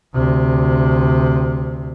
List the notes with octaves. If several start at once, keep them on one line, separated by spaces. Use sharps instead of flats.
D2 C3